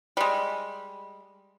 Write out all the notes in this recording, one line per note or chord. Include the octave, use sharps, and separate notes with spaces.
G3 G#3